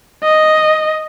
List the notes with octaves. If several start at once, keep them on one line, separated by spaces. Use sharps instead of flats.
D#5